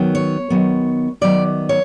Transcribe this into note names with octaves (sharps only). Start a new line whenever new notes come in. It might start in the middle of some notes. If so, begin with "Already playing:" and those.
Already playing: D#3 F#3 B3
C#5
D#3 F#3 B3
D#3 F#3 B3 D5
C#5